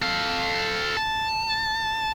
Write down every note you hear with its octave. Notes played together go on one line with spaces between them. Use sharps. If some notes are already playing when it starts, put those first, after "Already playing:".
A4 F5
A5